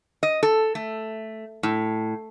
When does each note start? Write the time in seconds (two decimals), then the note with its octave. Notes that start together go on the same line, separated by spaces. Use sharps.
0.23 D#5
0.43 A4
0.75 A3
1.63 A2